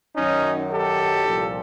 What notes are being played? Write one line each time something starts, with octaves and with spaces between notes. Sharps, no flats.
F#2 D#3 F#3 C#4 D#4
G4 A4
C2 A#2 F3